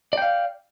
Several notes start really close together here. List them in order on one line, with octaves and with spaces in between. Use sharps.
D5 G5 F5